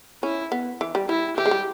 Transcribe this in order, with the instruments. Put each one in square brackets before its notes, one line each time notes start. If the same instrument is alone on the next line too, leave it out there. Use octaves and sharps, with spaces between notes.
[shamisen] C#4 [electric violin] E4
[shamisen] B3
E3
G3
[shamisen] G3 [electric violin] E4
[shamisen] E3 [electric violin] G4
[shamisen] G#3
G3